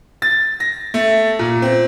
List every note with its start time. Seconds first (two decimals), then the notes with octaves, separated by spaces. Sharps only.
0.22 A6
0.60 A#6
0.94 A3
1.39 A#2
1.62 C4